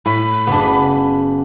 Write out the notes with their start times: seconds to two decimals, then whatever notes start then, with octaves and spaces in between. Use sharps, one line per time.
0.06 A2 B5
0.47 F#1 B3 D4